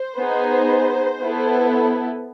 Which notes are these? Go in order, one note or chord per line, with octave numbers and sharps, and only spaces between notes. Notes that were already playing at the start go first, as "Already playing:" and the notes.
Already playing: C5
B3 D#4 G#4
B3 E4 A4